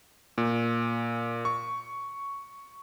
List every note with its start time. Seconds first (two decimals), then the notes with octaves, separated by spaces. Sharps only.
0.38 A#2
1.45 C#6